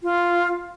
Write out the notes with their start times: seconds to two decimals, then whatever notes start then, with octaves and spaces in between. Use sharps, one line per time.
0.03 F4